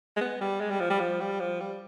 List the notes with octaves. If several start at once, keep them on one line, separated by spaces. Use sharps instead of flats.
G#3
B3
G3
G#3
G3
F3
G3
F3
G3
F3
G3